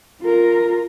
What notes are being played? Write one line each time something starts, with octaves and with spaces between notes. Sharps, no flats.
F4 A#4